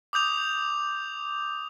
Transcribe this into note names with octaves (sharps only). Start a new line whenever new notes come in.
D6 D#6 G6 F7